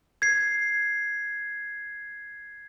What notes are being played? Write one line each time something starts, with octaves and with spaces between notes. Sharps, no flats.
G#6 C7